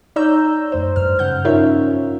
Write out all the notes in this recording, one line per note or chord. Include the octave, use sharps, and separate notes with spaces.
D#4 C#5 D5 A#5 E6 G6
F#2 A2 C5
G2 F6
C#3 F#5 G6
C#4 D#4 F4 A#4 C#5 E5